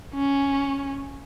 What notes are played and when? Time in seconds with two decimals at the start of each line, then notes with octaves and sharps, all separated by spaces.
0.14 C#4